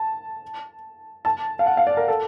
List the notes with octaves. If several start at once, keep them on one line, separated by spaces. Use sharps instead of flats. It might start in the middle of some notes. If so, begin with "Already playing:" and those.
Already playing: A5
A5
F5
F#5
F5
D5
A#4
A4